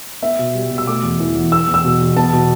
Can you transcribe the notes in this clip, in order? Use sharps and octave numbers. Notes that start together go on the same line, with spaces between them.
B3 E5
B2
G3
B2
E6
A3 D6
E2
E3
E2
B3 E6
E2
E6
B2
E2
B3 A5
B2